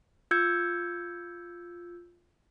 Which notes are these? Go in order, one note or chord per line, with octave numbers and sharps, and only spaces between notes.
F4 E6 G6 G#6 C#7